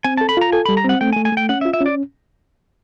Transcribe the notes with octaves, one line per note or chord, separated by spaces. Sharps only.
C4 G#5
A5
A4
B5
F4 A#5
A4 G#5
G3 B5
A#5
C4 F#5
A3 G5
G#5
A3
G#5
A3 G5
C#4 F#5
E5
F4
E5
C#4 D5